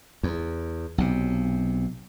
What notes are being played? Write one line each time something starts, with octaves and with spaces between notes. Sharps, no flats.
E2
B1 C3